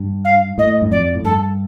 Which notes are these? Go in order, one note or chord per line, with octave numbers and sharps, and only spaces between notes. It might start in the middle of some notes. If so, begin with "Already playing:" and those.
Already playing: G2
F5
A2 D#5
G2
F2 D5
A2
G2 A4